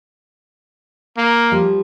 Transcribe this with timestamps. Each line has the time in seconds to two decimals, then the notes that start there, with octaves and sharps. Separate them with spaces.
1.17 A#3
1.52 F3 G3